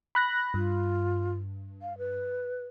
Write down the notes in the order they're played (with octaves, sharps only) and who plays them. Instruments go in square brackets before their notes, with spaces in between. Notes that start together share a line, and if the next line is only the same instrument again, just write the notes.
[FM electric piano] B5 F#6 A#6
[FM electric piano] G2 [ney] F4
[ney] F5
B4